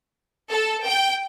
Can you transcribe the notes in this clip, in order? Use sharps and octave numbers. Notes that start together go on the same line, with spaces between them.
A4
G5